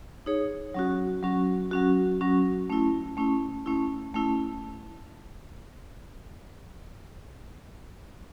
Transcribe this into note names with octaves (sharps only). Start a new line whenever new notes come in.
D#4 G#4 C#5
F#3 C#4 F#4
F#3 C#4 F#4
F#3 C#4 F#4
F#3 C#4 F#4
A3 C#4 E4
A3 C#4 E4
A3 C#4 E4
A3 C#4 E4